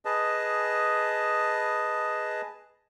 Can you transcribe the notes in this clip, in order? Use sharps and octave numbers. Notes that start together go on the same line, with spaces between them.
G#4 B4 D#5 A5